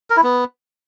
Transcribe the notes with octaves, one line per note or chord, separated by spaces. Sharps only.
A#4
E4
B3